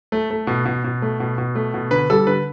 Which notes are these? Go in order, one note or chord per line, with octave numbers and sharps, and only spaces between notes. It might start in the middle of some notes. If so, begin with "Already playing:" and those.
A3
A3
B2
B2
B2
A3
B2
B2
A3
B2
D3 B4
G3 A4
D3 B4